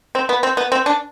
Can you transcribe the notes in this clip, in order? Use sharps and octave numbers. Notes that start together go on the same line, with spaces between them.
C4
B3
C4
B3
C4
D4